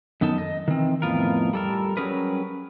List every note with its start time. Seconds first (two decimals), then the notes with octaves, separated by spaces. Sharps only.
0.21 F#2 D#3 B3 D#4 A4 A5
0.38 D#5
0.68 D#3 E3 C4
1.02 F2 A2 B3 F4 A#4
1.53 G3 A4 A#4
1.97 F#3 G3 C#4 G#4 A#4 B4